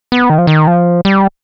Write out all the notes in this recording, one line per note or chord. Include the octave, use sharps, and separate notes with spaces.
B3
D#3
F3
D#3
F3
G3